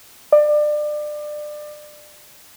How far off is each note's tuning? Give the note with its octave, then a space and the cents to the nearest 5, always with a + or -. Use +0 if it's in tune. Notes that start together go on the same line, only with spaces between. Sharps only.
D5 +25